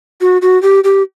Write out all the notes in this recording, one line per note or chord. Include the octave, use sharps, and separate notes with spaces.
F#4
F#4
G4
G4